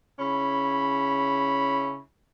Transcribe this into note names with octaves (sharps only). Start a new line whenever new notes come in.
C#3 C#4 E4 B5